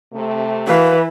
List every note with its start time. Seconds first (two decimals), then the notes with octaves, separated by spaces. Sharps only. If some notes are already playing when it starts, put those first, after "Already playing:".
0.12 C3 A3
0.67 E3 F#4 A#4 B4 F5